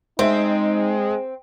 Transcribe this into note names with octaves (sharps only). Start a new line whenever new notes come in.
G#3 C4 D#4 C5 E5